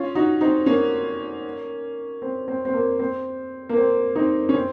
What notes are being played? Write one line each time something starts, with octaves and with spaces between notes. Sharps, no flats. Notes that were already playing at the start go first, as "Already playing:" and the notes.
Already playing: C#4 F4
D#4 F#4
C4 D#4
A#3 C#4
C4
C4
C4
A#3
C4
A#3
C4
C4 D#4
C#4
C4